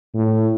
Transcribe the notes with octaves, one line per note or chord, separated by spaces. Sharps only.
A2